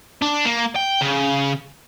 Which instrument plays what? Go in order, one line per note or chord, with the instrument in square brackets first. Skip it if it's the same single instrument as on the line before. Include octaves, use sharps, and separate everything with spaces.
[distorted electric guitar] D4
A#3
G5
C#3